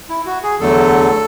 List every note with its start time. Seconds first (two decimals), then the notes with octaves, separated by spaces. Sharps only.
0.10 E4
0.26 F#4
0.43 G#4
0.60 E2 D3 F#3 A3 A4